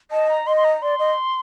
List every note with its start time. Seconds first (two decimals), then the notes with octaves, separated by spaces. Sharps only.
0.11 D#5 A5
0.29 A#5
0.47 D#5 C6
0.57 C6
0.64 A#5
0.82 D5 C6
0.99 D#5